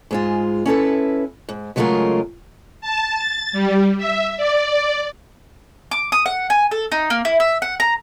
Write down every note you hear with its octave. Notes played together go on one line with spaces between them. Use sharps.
G#2 G#3 F4
C#4 E4 A4 B4
G#2
C#3 F#3 G#3 A3 F4 A#4
A5
A6
G3
E5
D5
D6
D#6
F#5
G#5
A4
D#4
A#3
E4
E5
F#5
A#5